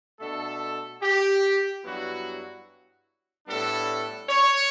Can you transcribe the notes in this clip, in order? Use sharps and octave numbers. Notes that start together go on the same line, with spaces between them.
B2 A3 D4 A4
G4
G2 F#3 B3 E4 F#4
A2 G3 B3 D4 A4
C#5